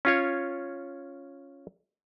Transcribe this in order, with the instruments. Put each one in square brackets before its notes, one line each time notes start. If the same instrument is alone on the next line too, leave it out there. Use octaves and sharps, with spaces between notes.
[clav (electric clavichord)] C#4 F4 C#5